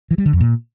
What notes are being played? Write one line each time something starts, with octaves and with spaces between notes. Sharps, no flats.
E3
G3
D3
F2
A#2